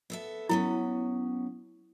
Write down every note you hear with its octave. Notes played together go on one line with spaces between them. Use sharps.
B3 A4 E5
F#3 B3 C#4 E4